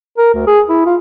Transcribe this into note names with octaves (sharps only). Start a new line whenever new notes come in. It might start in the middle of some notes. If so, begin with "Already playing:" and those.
A#4
D2
G#4
E4
F4